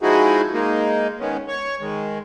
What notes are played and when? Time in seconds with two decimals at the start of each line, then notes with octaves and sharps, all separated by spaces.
0.01 F3 G#3 D#4 E4 F#4 G#4
0.53 G#3 A#3 D#4
1.20 D#3 G#3 B3 C#4
1.48 C#5 C#6
1.81 D#3 G#3